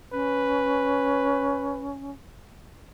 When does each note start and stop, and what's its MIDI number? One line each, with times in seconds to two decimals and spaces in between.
0.12 2.12 61
0.12 1.89 71